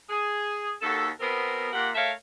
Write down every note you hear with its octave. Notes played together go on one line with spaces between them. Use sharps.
G#4
D#2 F#4 A4
B2 B3 C4 A#4
A#2 A#3 G4 F#5
A3 A#4 C#5 E5 F5